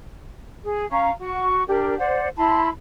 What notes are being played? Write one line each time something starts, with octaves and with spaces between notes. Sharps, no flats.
G#4
C#4 F5 A#5 C#6
F#4 C#6
D4 G4 A#4
C5 D5 F#5
E4 A5 B5 C6